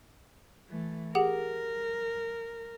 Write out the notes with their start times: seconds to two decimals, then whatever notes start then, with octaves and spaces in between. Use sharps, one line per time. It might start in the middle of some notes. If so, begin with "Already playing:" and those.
0.68 E3 A3
1.15 G4 G#4 A#4 F#5